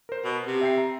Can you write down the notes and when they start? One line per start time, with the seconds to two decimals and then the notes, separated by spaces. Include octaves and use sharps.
0.09 A#4 C5
0.24 B2
0.47 C3
0.61 E5 G5 C7
0.78 A#5